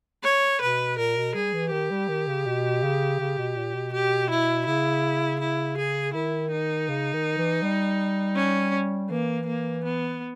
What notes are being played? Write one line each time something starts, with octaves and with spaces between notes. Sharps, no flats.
C#5
B2 B4
A#2 A#4
B2
G3 G#4
E3
D#3 G4
G3
D#3
C#3
B2
C#3
C#3
B2
A#2
B2
G4
E4
C#3 E4
E4
G#4
D#3 E4
D#4
C#3
D#3
E3
G3
C#4
E3 A#3
A#3
B3